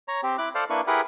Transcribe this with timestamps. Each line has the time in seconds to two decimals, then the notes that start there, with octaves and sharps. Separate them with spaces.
0.08 C#5 A#5
0.23 C4 G4
0.38 E4 D6 F#6
0.55 A4 C5 D5 F5
0.70 A#3 D4 E4 B4 C#6
0.87 E4 G4 G#4 A#4 B4 F#5